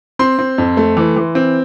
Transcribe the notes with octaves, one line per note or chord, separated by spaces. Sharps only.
C4 C6
C4
F2
A3
E3
E3
C4